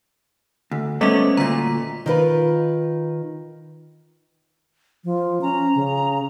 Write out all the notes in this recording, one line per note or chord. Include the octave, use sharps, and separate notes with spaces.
D2
G3 A3 B3 C#4 D#5 D6
D2 A#2 A#5 B6
D#3 F4 B4
F3
C#4 A#5
C#3